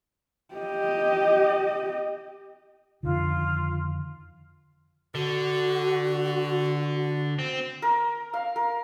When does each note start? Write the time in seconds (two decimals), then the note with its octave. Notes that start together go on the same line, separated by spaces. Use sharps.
0.55 G4 D#5
3.03 F2 D3 D#3 F4
5.15 D3 F#4
7.39 C4
7.82 A#4
8.34 F5
8.56 A#4